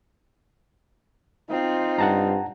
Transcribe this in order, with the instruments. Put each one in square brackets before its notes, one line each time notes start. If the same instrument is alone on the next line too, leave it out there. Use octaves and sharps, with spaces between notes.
[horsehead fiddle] C4 F4 [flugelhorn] D#4
[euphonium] G2 [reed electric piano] F#5 A5 A#5